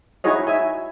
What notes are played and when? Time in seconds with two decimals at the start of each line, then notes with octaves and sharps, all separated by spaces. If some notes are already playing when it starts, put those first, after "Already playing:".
0.24 D#4 E4 F#4 G#4 C#5 D#5
0.47 E5 G#5